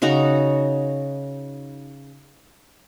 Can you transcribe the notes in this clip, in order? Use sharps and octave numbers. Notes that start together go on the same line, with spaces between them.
C#3 D#4 F#4 A#5